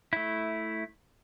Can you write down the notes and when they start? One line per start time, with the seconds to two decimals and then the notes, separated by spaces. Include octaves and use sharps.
0.13 A3 E4